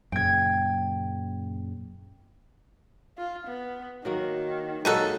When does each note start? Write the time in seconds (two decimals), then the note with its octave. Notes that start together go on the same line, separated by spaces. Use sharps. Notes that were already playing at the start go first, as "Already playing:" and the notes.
0.12 F#2 A#2 C#3 G5 G#6
3.18 F4
3.47 B3
4.05 D#3 F#3 A#3 F#4
4.85 A#2 F#3 G#3 A#3 D#4 F#4 A4